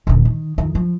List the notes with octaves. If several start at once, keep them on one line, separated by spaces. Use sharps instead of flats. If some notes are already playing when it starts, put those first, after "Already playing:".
D#1 D3
D#3
F2 D#3
F3